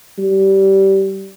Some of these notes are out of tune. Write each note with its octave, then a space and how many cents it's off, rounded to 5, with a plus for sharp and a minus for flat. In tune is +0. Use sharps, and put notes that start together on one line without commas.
G3 -20